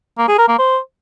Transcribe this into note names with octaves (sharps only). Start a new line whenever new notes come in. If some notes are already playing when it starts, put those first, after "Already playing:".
A#3
G#4
A#4
A#3
C5